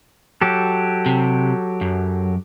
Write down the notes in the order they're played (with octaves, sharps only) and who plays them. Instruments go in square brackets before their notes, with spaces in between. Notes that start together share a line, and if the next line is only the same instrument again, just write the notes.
[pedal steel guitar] F#3 G4 A4
[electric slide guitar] C3
F#2